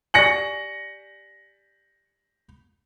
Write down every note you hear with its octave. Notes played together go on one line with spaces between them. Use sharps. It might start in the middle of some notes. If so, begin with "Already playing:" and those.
G4 D5 G#5 A#6 C#7 F#7